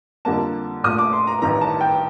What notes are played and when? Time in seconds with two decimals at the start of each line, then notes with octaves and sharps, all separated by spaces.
0.25 F2 D3 G3 A#3 A5
0.83 A#1 A#2 A3 D#6
0.98 D6
1.13 C6
1.27 A#5
1.42 A1 G2 D#3 A#5
1.61 A5
1.81 G5